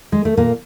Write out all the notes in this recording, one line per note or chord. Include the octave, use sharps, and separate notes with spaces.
G#3
A3
A#2 A#3